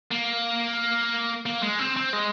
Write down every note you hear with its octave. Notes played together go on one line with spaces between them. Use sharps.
A#3
A#3
G#3
C4
C4
G#3